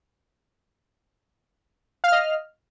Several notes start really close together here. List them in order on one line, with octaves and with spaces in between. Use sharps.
F5 F6 D#5